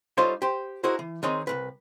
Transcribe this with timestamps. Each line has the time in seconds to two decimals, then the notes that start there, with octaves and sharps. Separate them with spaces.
0.17 G3 D#4 F4 A4 C5 C#5
0.42 G4 C5
0.84 D#4 E4 F#4 G#4 A#4 C5
0.99 E3
1.23 D#3 C4 D#4 G#4 C#5 C6
1.47 C2 E3 B4